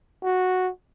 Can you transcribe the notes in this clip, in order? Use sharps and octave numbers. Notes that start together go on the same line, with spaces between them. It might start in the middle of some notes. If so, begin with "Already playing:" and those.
F#4